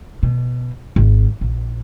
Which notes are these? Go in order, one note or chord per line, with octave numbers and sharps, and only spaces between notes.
B2
G#1
A#1